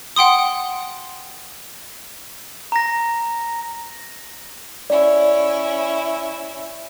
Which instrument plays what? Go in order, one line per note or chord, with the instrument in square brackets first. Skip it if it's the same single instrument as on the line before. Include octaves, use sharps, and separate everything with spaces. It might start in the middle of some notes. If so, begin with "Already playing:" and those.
[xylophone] F#5 G5 C6 D#6
[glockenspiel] A#5 A#6
[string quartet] C#4 E4 [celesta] D5